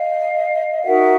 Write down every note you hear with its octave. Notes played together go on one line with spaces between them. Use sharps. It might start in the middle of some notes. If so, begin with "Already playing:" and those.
Already playing: D#5 F5
D#4 F#4 A#4 E5 F#5